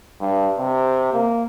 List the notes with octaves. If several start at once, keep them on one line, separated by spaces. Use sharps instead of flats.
G2
C3
A#3